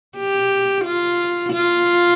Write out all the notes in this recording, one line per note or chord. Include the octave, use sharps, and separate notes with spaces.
G4
F4
F4